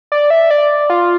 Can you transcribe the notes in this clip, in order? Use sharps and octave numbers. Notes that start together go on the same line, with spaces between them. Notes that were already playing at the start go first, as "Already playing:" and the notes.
D5
E5
D5
F4